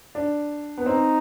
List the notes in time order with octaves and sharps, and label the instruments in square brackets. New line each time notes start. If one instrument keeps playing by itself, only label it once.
[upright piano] D4
B3
[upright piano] C4 [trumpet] D#4